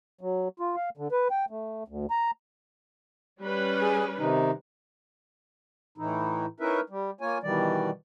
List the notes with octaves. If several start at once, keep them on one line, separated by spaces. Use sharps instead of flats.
F#3
F4
F5
D3
B4
G5
A3
D2
A#5
G3 C#4 B4
G#4 G#5
C3 D#3 D#4
A2 E3 D#4 E4
C#4 D#4 E4 A#4 B4 E5
G3
A#3 F4 C#5 G#5
B2 D#3 E3 G3 D5